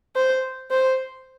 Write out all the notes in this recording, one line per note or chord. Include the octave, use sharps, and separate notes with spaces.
C5
C5